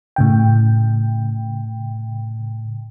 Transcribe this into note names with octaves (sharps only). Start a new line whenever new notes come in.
A2 C#3 G5